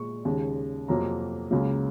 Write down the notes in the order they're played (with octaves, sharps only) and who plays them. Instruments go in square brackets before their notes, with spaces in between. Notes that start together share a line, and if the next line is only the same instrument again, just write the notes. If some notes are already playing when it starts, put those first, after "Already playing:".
Already playing: [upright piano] A#2 G#3 C#6
D#2 C#3 G#3
F2 C3 F#3 A#3 A#5
C#2 C#3 F#3 A#3